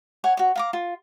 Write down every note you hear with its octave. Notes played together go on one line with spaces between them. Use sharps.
C#5 F#5 G#5
F#4 C#5
F5 A#5 D6
F4